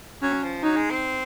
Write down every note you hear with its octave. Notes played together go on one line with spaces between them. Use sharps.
F#3 C#4
F3
F#3 D#4
G#3
C4